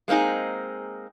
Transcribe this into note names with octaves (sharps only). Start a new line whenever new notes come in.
G#3 A#3 C4 D#4 G#4